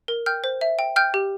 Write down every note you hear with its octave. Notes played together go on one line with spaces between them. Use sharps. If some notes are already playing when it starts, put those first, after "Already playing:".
A#4
G5 F6 G6
C5
E5
G5
G5 F6 G6
G4